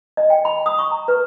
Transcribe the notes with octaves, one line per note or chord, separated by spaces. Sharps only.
D#5
G5
B5
D#6
C#6
A#5
B4